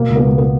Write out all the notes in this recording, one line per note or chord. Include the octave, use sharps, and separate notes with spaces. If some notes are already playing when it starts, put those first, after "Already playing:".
Already playing: B2 A#3
C#2
B3
C#2 A#3
B3